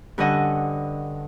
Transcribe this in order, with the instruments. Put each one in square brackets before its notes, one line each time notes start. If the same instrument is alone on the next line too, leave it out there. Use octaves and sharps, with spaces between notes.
[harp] G2 D3 C#4 D#5 F#5